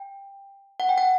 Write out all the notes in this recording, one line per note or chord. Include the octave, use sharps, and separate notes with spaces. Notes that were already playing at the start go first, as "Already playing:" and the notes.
Already playing: G5
F#5
G5
F#5